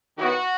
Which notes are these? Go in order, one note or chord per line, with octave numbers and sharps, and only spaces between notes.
D#3 F#3 B3 E4 F#4